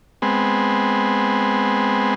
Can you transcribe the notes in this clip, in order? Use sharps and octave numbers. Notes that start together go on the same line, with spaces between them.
G#3 B3 C4